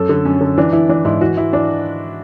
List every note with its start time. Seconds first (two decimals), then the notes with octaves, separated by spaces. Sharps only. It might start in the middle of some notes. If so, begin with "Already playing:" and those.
Already playing: F#2 A4
0.09 D3
0.25 F#2 C#4
0.41 D3
0.58 E3 D4
0.73 E3 E4
0.89 E3 D4
1.05 G#2 E4
1.21 E3 F#4
1.37 E3 E4
1.53 E3 D4